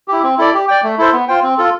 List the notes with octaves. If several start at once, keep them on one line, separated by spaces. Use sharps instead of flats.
E4 G4
C4
E4 A4 D5
G4
D5 G5
A3
E4 A4 C5
B3
F4 C5 G5
C4
F4 A4